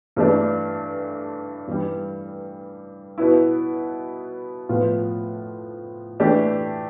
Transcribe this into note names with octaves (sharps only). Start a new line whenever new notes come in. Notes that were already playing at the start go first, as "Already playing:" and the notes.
G2 E3 A3 D4
G2 E3 G3
B2 B3 E4
A2 F3 B3 F4
E3 A3 D4 G4